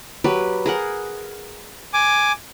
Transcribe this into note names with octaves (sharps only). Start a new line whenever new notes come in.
F#3 G4 B4
G#4 A#4 F#5
G#5 D6